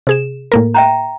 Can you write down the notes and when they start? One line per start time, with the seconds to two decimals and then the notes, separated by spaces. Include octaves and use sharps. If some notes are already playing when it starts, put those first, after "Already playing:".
0.07 C3 G#4 E7
0.52 A2 A#3 A#4
0.74 E5 G5 A#5